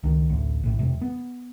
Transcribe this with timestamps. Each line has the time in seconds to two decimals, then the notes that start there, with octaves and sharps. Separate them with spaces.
0.03 C#2 D#3
0.29 A1 D2
0.63 A#1 A2
0.79 E1 C3
1.01 B3